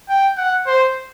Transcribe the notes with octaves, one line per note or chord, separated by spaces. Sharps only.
G5
F#5
C5